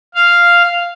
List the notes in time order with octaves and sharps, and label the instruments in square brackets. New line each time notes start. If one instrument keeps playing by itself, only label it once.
[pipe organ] F5